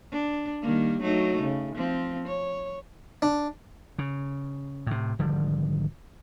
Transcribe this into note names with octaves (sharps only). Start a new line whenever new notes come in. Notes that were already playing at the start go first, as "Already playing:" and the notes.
D4
D#3 G3 A#3
F#3 A3 D#4
C#3
F3 C4
C#5
D4
C#3
A2 C3
G#1 D3 F3 G3